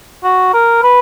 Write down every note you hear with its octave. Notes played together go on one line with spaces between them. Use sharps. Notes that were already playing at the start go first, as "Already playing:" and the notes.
F#4
A#4
B4